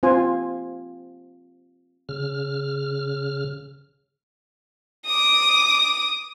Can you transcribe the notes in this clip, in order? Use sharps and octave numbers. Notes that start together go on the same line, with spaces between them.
C4 F4 C5 G#5
C#3 F6
D6 D#6